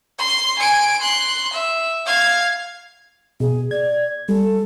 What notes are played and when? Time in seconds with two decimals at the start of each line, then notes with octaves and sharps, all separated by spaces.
0.18 C6
0.59 G#5 D7
1.02 C6 F#6
1.53 E5
2.06 F5 G#6
3.40 B2 G#4
3.71 D5 G#6
4.29 G3 A4